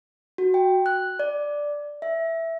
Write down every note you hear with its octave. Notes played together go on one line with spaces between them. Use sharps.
F#4
G5
F#6
D5
E5